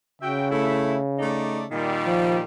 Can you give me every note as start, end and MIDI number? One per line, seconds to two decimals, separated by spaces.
0.22 1.74 49
0.22 0.47 66
0.22 0.47 76
0.22 0.47 79
0.50 0.96 57
0.50 0.96 64
1.19 1.63 57
1.19 1.63 63
1.19 1.63 74
1.71 2.43 46
1.71 2.43 51
1.71 2.43 55
2.06 2.37 53